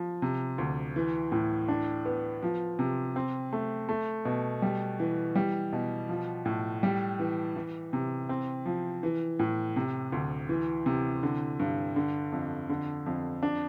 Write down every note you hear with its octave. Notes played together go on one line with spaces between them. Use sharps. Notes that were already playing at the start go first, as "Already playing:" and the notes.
Already playing: F3
C3
D2
E3
A2
D4
B3
F3
C3
C4
A3
A3
B2
G3
E3
G3
B2
F3
A2
G3
E3
E3
C3
C4
F3
E3
A2
C3
D2
E3
C3
D3
G2
D3
F2
D3
F2
D4